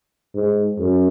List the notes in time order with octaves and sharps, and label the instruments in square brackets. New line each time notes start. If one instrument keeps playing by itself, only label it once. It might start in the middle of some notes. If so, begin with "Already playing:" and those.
[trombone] G#2
F#2